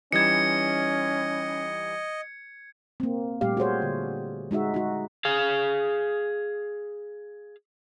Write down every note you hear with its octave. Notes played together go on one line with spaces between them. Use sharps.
E3 G3 C#4 D#4 D#5 G#6 C#7
A#3 C4
A#2 G3 A3 G4 F5
F#4 G#4 C5 C#5
D3
G#3 D#4 F#4 E5
D#4 F#4
G#4 F5